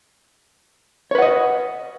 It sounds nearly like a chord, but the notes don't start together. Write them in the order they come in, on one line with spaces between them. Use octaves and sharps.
C#5 B4 F#5 D#5